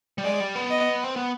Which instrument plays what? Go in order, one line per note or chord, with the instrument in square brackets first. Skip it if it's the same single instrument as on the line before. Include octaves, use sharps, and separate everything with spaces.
[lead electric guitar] G3
[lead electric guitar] G#3 [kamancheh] D5
[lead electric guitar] G3
B3
[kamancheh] D#5
[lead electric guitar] C4
B3